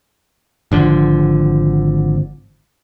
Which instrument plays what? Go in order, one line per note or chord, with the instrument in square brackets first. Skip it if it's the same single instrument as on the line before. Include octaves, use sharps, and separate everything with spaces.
[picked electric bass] G#1 D3 F3